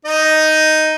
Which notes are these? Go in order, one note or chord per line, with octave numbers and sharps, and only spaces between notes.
D#4 D#5